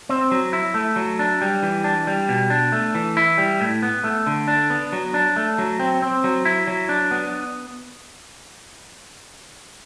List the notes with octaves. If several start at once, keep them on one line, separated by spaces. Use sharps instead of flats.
C4
F#3
E4
A3
F#3
D4
G3
E3
D4
G3
B2
D4
A3
E3
E4
G3
A2
B3
A3
D3
D4
B3
F#3
D4
A3
F#3
C4
C4
F#3
E4
F#3
D4
B3